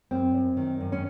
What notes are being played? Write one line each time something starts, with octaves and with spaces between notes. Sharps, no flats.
F#2 C4
F#2
D#3
F#2
C#4